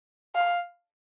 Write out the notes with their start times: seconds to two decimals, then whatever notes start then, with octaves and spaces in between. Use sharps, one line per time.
0.35 F5